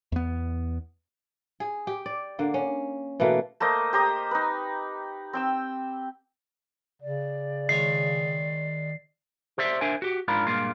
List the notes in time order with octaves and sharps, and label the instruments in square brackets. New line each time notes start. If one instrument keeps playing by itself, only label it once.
[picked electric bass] E2 B3
[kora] G#4
G4
D5
D3 A#3
C#4
B2 E3 A3 A#3
[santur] A3 A#3 C5 D#5
G4 C5 A#5 D#6
D#4 B4
C4 G5 E6
[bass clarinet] C#3 [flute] D5
[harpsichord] D#3 G#3 C#5 [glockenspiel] C7
[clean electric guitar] G4 C5 D5 E5
D4 A#4 C5 E5 G#5
F#4 G4
G#2 D4 F4 A#4 B5
G2 A#2 G#3 A#3 F4